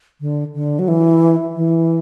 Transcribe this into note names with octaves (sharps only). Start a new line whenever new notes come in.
D3
D3
F#3
E3
E3